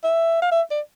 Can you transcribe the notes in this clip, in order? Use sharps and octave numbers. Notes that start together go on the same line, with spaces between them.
E5
F5
E5
D5